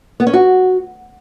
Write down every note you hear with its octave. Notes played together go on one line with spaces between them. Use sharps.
B3
C#4
F#4